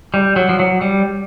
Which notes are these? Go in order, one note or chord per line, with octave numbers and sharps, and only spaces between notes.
G3
F#3
F3
F#3
G3